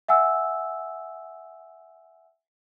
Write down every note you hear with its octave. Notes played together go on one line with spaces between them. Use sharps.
E5 F#5 G#5 E6